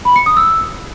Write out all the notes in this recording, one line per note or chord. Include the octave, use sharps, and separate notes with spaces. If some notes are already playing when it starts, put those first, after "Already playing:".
B5
C#7
D#6
E6